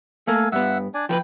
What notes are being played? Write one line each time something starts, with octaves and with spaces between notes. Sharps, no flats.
A3 A#3 A4 F5 G#5
G2 B3 E5 F#5 E6
D4 D5 G#5
F3 A#4 B4 G5